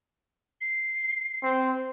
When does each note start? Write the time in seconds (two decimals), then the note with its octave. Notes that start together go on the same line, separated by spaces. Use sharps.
0.61 C7
1.43 C4